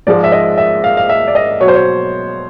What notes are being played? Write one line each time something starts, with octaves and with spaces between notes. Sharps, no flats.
G#2 F3 G#3 D5
E5
D#5
E5
F5
F5
E5
D5
D#5
B2 F#3 C#5
C5
C#5